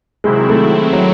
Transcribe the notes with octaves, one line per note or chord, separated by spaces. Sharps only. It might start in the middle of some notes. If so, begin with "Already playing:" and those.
C3 D#3 F#3 G#3 C4 E4
A3
F#3